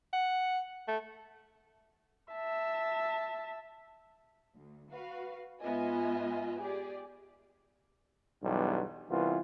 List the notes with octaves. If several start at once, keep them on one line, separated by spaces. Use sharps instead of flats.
F#5
A3
E5 A5
D2
F#4 B4 F5
G#2 B3 F4 D#5 E5 G#5
G4 G#4 D5
B1 E2 G2
C2 E3 B3 F4